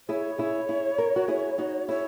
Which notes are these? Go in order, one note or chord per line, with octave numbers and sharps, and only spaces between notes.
E4 G#4 C#5
E4 G#4
E4 G#4
A#4
F#4 A#4
E4 G#4
D#4 F#4
E4 G#4 C#5